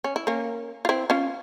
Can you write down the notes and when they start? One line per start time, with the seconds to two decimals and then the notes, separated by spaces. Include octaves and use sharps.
0.04 C#4
0.16 E4
0.27 A#3 C#4
0.85 F4
0.89 C4 E4
1.10 C#4 F4